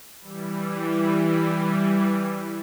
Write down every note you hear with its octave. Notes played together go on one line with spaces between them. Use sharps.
E3 G3